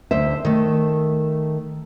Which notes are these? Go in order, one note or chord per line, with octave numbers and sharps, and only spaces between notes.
D2 C5 E5
D#3 A3